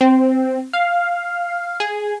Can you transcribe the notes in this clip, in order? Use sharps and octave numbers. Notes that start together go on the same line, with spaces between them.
C4
F5
G#4